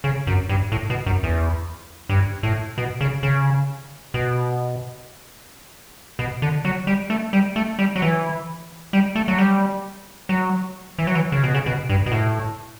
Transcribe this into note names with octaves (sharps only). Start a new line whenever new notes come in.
C#3
F#2
G2
A2
B2
F#2
E2
G2
A2
B2
C#3
C#3
B2
B2
D3
F#3
G3
A3
G3
A3
G3
F#3
E3
G3
A3
F#3
G3
F#3
E3
F#3
E3
C#3
B2
C#3
B2
G2
B2
A2